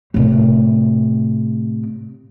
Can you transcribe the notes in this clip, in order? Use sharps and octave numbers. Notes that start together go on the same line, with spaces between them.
A2 C3